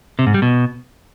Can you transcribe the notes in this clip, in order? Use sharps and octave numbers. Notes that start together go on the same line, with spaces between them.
C3
G#2
G3
B2